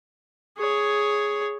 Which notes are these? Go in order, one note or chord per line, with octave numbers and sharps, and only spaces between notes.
G#4 C#5